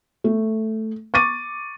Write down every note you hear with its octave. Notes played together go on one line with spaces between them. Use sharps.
A3
C#6 D6 A6 D#7